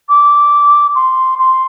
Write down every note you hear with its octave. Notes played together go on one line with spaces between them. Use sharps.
D6
C6
C6